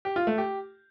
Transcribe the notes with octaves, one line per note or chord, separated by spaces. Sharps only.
G4
F4
A3
G4